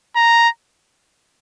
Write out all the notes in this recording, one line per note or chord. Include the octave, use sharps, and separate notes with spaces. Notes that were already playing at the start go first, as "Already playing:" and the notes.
A#5